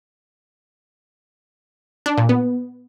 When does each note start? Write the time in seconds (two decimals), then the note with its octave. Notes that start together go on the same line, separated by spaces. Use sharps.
2.06 D4
2.18 A#2
2.29 B3